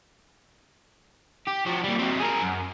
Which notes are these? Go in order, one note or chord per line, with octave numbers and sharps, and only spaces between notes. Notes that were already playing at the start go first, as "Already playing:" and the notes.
G4
F3 F#4
G3 A#3
F#3 C4
G#4 A#4
F#2